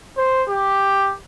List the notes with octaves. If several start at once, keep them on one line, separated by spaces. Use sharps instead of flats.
C5
G4